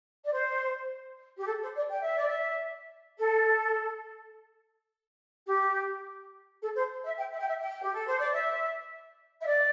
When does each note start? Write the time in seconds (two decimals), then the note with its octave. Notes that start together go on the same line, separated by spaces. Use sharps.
0.25 D5
0.33 C5
1.38 G4
1.46 A4
1.61 C5
1.75 D5
1.89 G5
2.02 E5
2.15 D5
2.27 E5
3.18 A4
5.46 G4
6.61 A4
6.74 C5
7.04 E5
7.18 G5
7.32 E5
7.40 G5
7.47 E5
7.61 G5
7.81 G4
7.93 A4
8.06 C5
8.19 D5
8.32 E5
9.41 E5
9.45 D5